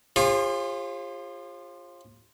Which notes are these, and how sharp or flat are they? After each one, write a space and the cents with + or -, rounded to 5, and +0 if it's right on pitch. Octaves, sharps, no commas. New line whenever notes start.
F4 +0 G#4 -45 C5 +45